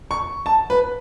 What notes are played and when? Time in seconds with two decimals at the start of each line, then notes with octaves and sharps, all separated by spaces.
0.11 C#6
0.46 A5
0.70 B4